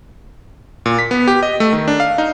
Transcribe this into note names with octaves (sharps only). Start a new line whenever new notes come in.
A#2
B6
B3
G4
D#5
A3
D#3
D4
F5
D#4